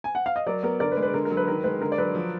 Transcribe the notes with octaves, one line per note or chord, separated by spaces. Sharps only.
G#5
F#5
F5
D#5
F#3 A#4 D5
B3 A#4
D3 A#4 D5
B4
G#3
B4
D3 A#4
A#4
F#3
B4
D#3 A#4
G#3 B4
D3 A#4
D5
F#3 B4
F3